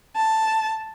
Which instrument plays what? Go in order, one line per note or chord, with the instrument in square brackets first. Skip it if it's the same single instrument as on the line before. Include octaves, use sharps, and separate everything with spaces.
[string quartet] A5